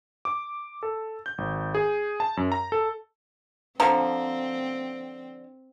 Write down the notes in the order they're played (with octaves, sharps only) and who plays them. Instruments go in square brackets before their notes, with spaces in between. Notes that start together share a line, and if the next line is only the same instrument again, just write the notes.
[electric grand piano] D6
A4
G6
G#1
G#4
A5
F#2
A#5
A4
[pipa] D3 F3 [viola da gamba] C4 [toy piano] A#5